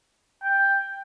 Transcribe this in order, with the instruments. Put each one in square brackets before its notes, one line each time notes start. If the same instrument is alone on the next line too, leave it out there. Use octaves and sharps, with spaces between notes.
[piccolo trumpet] G5